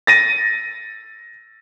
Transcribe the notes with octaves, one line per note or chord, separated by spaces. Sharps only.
A6 A#6 D#7